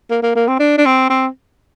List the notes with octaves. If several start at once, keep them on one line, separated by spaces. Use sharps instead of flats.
A#3
A#3
A#3
C4
D4
D4
C4
C4